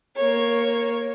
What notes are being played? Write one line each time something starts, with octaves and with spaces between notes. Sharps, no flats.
A#3 C#5